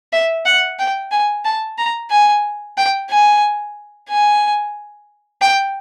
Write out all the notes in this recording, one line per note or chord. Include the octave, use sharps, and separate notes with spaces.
E5
F#5
G5
G#5
A5
A#5
G#5
G5
G#5
G#5
G5